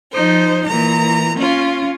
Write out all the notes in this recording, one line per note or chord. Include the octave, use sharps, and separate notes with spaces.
F3 D#4 C5
A#2 E3 A#5
C#4 F4